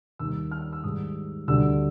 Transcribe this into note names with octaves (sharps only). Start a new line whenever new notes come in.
D#2 D#3 G3 E6
F6
E6
G#2 D#3 G3 D#6
D2 D3 G3 E6